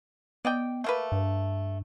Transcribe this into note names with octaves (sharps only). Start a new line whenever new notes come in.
B3 D5 D#5 G5
A3 A#3 B4
G2